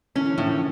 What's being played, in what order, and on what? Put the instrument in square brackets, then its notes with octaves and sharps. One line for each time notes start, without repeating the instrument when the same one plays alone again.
[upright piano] D3 E3 [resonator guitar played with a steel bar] C#4
[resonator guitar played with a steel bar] A2 [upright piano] D#3 F3